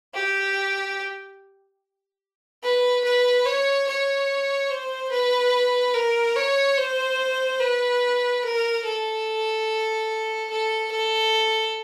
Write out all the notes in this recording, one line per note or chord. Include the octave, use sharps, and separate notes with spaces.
G4
B4
B4
C#5
C#5
C5
B4
A#4
C#5
C5
B4
A#4
A4
A4
A4